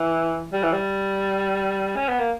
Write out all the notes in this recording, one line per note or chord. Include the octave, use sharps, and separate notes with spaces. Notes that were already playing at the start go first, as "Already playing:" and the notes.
Already playing: E3
G3
E3
G3
C#4
B3
A#3